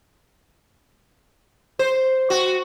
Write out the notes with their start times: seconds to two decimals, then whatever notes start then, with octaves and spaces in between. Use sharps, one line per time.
1.79 C5
2.30 F#4